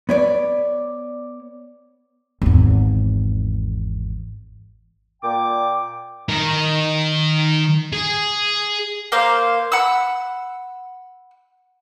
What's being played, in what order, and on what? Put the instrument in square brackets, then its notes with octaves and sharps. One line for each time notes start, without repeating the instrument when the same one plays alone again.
[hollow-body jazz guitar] B3 C#5 D5
[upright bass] G#1 E2
[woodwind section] A#2 G5 D6
[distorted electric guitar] D#3 A#4
G#4
[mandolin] A#3 C5 F5
F#5 B5 E6